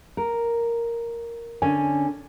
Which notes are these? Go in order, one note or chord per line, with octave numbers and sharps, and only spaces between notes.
A#4
D3 C#4 G#5